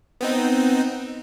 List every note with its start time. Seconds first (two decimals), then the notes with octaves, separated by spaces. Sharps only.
0.21 B3 C4 D#4